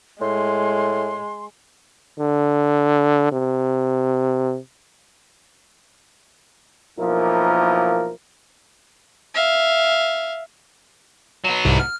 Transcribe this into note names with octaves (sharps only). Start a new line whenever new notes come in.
A2 G#3 C6
D3
C3
B1 F3 A#3 E4 A#4
E5 F5
F#3 B3
C2 G#2 C3
F6